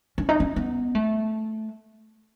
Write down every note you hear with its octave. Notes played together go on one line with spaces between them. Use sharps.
C#4
D#4
C#4
B3
A3